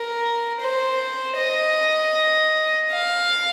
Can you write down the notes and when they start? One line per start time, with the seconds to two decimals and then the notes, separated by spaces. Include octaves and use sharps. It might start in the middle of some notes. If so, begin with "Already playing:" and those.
Already playing: A#4
0.61 C5
1.37 D#5
2.91 F5